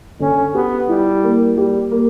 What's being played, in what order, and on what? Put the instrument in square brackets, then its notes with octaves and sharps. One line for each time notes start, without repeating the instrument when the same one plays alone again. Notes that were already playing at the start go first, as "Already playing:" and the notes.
[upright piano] D3 [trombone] C#4
[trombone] B3 [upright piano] G4
[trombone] G3 [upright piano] E4
[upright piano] A#3
[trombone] G3 [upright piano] G4
[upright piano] A#3